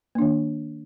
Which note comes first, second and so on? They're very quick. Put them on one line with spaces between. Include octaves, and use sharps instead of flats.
A#3 D4 D#3